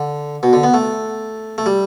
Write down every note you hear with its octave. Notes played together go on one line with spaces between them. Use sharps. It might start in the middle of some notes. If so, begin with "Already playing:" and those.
Already playing: D3
B2
D3
B3
A3
A3
G3